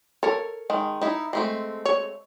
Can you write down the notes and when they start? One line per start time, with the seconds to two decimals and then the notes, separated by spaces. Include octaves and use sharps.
0.23 A4 A#4 C#5
0.70 D#3 G#3
1.02 D#4 E4
1.33 G#3 A3 C4
1.86 C#5